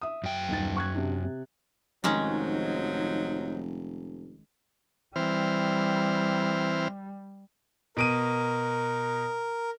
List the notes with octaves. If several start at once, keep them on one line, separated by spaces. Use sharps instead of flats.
E5 D#6
F#2 G5
D#1 D#4 A6
C#6 F#6 G#6
C3 D4
C3
F1 G#2 D#3 F3 F#3 G#3 C#4 D#4
E3 G3 C4 F6
B2 A#4 D7 D#7